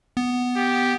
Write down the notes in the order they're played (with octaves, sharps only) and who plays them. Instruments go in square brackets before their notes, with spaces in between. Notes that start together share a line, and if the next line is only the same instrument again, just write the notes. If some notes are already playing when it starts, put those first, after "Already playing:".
[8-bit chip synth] B3
[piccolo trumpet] G4